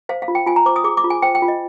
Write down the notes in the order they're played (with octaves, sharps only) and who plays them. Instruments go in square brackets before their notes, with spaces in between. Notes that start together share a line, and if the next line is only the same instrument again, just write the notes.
[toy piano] C5 F5
F5
F4
G5
F4 G#5
A#5
C5 D6
D#6
G#4 D6
D6
F4
G#5
C5 G5
G5
F4
D#5